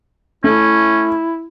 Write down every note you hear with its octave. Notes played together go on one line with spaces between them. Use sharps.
A3 C#4 E4